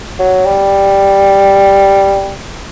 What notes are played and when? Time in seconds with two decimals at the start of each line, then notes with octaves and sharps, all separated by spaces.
0.19 F#3
0.46 G3